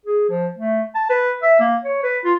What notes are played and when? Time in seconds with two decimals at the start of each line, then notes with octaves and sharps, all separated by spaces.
0.05 G#4
0.29 F3
0.56 A3
0.95 A5
1.10 B4
1.42 E5
1.60 A#3
1.84 C#5
2.03 B4
2.25 F4